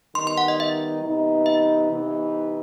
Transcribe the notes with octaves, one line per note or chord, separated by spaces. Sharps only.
D#3 G3 B3 D#4 C6
C6
F#5
D#5
E5
C3 E3 B3 D#4
E5
C3 E3 B3 D#4